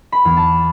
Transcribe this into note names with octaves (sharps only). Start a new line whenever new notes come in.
B5
E2
A5